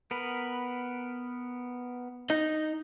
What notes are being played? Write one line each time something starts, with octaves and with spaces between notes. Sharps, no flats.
B3 A#4 B4
D#4 D#5